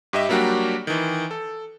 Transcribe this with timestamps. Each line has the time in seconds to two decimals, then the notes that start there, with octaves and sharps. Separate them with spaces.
0.13 G2 G4 D#5 E5
0.29 F#3 G3 A#3 D4 F#4 G4
0.87 D#3 E3
1.31 A4